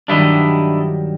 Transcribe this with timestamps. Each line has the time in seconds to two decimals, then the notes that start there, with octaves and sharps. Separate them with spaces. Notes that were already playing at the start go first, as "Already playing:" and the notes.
0.08 G2 D#3 F#3 D4 E4 D#5